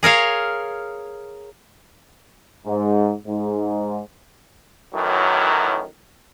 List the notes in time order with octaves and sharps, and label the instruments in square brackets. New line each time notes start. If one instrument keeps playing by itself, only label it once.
[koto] G#4 A#4 C#5 F5
[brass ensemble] G#2
G#2
[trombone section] F#2 A2 D#3 E3 F#3